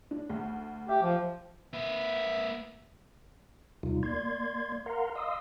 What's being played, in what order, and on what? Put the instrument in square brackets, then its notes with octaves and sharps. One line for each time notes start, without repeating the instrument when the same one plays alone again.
[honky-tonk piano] D4
D2
[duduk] G4 [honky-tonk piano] E5
[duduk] F3
[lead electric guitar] A#3 B4 [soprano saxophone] E5
[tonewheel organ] D#2 C3 G3 D#4 F4
A#3 D5 C6 G#6
A#4 F5 F#5 A#5 C6
D#5 F5 C6 D#6 E6